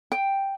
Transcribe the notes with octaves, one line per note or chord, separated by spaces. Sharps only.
G5